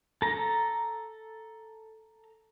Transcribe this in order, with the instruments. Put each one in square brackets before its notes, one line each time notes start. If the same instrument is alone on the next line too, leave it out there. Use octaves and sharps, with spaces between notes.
[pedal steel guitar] A4 A#5